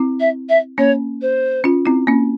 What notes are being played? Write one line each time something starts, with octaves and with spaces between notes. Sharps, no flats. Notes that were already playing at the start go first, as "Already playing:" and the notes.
Already playing: C4 E4
E5
E5
A#3 C#4 C#5
C5
C#4 F4
C4 E4
A#3 C#4